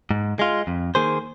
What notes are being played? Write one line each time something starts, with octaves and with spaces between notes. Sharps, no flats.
G#2
G#3 F4
F2
D#3 A#3 G#4 C5